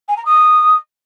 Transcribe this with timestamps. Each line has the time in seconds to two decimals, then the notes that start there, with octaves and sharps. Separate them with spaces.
0.08 G#5
0.17 A#5
0.25 D#6